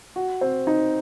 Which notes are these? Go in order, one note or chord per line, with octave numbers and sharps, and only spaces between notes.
F#4
C4
D#4